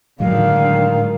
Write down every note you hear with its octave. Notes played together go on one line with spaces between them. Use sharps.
A2 D3 D#3 F#3 G#3 F5